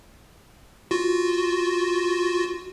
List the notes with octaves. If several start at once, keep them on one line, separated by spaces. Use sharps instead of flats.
F4 F#4